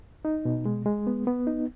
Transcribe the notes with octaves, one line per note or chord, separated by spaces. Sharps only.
D#4
B2
G#3
G#3
B3
B3
D#4